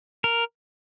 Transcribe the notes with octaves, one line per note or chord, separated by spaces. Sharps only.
A#4